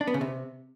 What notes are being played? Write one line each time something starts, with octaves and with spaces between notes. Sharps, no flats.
D4
B3
C#3
C3